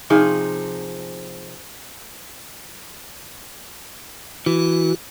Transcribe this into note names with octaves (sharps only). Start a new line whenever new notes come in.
C3 F3 D#4 G#4
E3 F#4